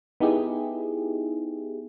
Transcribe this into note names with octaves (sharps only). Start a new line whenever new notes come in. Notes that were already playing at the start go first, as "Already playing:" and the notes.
B3 D#4 E4 G4 G#4